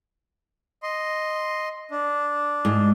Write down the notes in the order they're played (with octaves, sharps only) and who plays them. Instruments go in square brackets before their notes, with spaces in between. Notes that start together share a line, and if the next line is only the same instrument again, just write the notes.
[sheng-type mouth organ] D#5 C6
D4
[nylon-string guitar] G#2